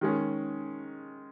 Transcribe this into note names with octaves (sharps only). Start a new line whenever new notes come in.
D#3 G#3 C#4